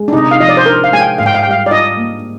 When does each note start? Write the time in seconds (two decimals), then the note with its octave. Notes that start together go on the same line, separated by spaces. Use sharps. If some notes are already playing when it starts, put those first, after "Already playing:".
Already playing: G#3
0.08 D4
0.13 C3 D#4
0.31 F5
0.40 F3 D#5
0.49 D5
0.57 C5
0.66 D4 A#4
0.84 F5
0.92 G#3 G#5
1.01 G5
1.18 G#2 F5
1.26 G5
1.34 F5
1.43 G3 G5
1.51 F5
1.66 D5
1.71 F4 D#5
1.97 A#3